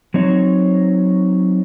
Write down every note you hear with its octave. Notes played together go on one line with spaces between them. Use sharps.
F#3 C4 D#4 C#5